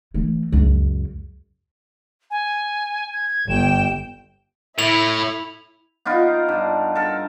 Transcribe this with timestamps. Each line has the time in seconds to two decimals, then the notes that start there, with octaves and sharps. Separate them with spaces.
0.14 E3 A3
0.52 C#2 F#2
2.31 G#5
3.13 G#6
3.49 G1 G5 E7
4.79 A2 E4 F7
6.05 B3 D#4 F4 A#4
6.49 G2
6.95 A4 A#4